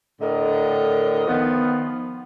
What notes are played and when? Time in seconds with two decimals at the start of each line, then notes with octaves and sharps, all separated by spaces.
0.20 A2 D3 A#4 D#5
1.27 D#3 F3 B3